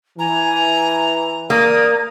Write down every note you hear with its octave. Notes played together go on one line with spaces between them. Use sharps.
E3 G#5 A#5
A#3 D5 D#6